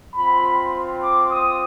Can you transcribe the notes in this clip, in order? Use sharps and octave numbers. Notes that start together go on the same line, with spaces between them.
C4 F4 B5
D6
D#6